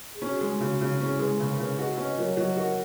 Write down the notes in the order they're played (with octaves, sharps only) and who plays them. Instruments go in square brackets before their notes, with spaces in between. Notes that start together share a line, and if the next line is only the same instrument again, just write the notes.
[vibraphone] G#4
[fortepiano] C#4 [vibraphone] D#4 F#4
[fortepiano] G#3
C#3
C#3
[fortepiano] C#4 [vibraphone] E4 G#4
[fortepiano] G#3 [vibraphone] G#4 B4
[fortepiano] C#3 [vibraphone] G#4 B4
[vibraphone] A#4
[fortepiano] C#3 [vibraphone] G#4 B4
[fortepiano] F#4 [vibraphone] B4 D#5
[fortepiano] C#4 [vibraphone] B4 D#5
[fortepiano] F#3 [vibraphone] A#4 C#5
[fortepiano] F#3 [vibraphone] B4 D#5
[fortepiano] F#4 [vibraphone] A#4 C#5